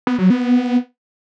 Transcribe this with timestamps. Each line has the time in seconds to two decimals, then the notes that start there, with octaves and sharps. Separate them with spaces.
0.07 B3
0.19 F#3
0.30 B3